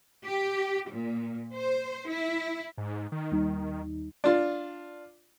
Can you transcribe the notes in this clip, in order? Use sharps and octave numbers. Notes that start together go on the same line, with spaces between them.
G4
A#2
C5
E4
G#2
D#3
D#2 G3 D#4
D4 F4